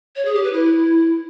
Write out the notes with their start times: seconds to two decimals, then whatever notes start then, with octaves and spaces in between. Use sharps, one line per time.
0.16 C#5
0.25 G#4
0.34 G4
0.44 B4
0.53 E4